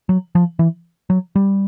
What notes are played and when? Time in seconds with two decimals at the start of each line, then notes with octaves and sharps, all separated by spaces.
0.09 F#3
0.35 F3
0.59 E3
1.10 F#3
1.36 G3